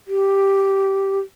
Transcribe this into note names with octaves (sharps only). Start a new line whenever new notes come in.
G4